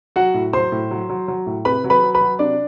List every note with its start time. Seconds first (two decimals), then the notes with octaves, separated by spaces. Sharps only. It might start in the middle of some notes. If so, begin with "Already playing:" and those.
0.16 F#3 F#4 F#5
0.34 A2
0.53 F#3 C5 C6
0.72 A2
0.91 F#3
1.09 F#3
1.28 F#3
1.46 A2
1.65 C3 B4 B5
1.84 F#3
1.90 B4 B5
2.03 F#3
2.14 B4 B5
2.21 F#3
2.39 C3 D4 D5